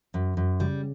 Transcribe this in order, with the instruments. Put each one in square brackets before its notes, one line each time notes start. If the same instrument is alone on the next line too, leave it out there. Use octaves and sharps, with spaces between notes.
[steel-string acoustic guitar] F#2
F#2
[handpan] C#3 [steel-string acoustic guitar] G3